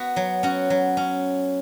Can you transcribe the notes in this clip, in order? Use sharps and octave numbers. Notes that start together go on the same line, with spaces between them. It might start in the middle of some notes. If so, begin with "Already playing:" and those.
Already playing: B3 F#4
F#3
C#4 F#4
F#3
C#4